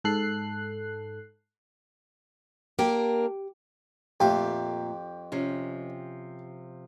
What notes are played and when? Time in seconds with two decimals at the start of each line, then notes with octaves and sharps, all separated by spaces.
0.04 G#2 A4 F#6 C7
2.79 A#3 D4 G4 A#4
4.20 F2 A#2 A3 G4 F5 G5
5.32 C3 F3 C#4